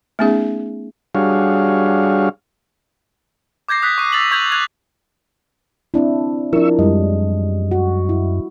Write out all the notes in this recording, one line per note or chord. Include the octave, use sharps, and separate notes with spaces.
A3 B3 C#4 D#4 G#4
G3 D4 F#4 G#4 C#5 F5
D6 G6 G#6 A#6 C7
D#6 F#6 B6
C#6 D#7
E6 A6 F7 F#7
C#6 G6 G#6 A#6 F7 F#7
F#6 G#6 F7
C4 D4 E4
F3 D4 E4 A#4 E5 C#6 E6
F#2 G3 G#3 D#5
F#4
E4